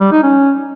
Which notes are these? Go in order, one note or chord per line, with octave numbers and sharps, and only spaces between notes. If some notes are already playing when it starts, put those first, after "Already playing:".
G3
D#4
C#4